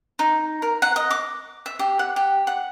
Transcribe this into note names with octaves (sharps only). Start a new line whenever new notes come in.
D#4
A#4
F#5
D#5
D6
E5
G4
F#5
G4
F#5